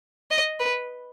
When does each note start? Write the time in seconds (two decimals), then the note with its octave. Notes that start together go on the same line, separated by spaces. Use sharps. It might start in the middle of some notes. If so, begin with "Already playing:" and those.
0.31 D#5
0.60 B4